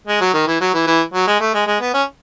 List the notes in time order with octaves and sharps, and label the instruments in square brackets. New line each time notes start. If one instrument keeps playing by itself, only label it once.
[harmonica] G#3
F#3
D#3
E3
F#3
E3
E3
F#3
G#3
A3
G#3
G#3
B3
C#4